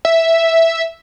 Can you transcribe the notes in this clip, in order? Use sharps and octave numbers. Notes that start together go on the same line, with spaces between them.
E5